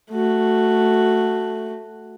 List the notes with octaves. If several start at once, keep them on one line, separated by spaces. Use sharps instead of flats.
A3 F#4